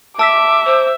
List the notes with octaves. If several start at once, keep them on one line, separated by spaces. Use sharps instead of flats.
E5 A5 D6 E6 B6
C5